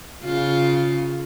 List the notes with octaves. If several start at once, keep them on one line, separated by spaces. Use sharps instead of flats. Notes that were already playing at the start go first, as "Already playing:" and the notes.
C#3 F4